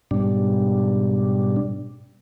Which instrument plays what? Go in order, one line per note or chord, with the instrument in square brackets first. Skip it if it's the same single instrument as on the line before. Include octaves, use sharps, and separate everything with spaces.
[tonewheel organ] G#2 B2 G3 D4